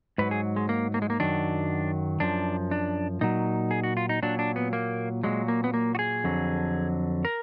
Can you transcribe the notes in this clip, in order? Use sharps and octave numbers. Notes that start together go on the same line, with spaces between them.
G#2 F#3 B4
G#4
G#3
A#3
A#3
G#3
A#3
F#2 D#3 F#3 D4
F#2 F3 D4
D4
A#2 F#3 D#4
G#4
F#4
F4
D#4
A#2 F#3 D4
D4
B3
A#3
A#2 F#3 G#3
A#3
B3
A#3
F#4
G#4
F2 D3 F#3
A#4